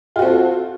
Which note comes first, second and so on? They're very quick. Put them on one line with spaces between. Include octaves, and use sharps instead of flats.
F4 F#4 C4 A4